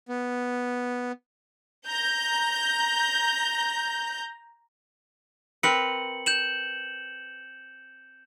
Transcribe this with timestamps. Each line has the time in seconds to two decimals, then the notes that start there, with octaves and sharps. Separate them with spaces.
0.08 B3
1.87 A#5 G6
5.63 C4 A#4 B4 C#7 F#7
6.26 G6 E7 F#7